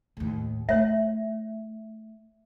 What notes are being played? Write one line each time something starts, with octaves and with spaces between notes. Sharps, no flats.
D#2 A2
A3 C#5 E5